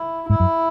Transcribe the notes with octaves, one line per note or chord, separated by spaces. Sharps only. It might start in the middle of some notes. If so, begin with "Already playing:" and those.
Already playing: E4
G#2 E4
F#2